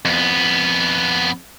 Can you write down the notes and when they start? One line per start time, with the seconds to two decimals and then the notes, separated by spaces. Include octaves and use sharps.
0.05 F2 B3